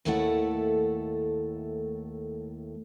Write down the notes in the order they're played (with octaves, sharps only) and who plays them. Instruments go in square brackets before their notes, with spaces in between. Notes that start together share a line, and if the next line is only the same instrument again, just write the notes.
[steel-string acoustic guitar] D#2 A2 A3 E4 A4 F#5